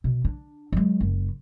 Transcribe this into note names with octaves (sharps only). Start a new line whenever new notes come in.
B2
D4
F#3 G#3
F#1